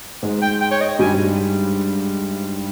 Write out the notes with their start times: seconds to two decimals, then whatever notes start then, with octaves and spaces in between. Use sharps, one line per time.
0.23 G#2 G#3
0.42 G5
0.61 G5
0.71 C#5
0.81 D#5
0.99 G2 G3 G#5